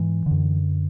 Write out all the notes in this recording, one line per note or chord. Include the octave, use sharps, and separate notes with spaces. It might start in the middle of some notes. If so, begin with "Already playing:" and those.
Already playing: G#2 E3
F#2 D3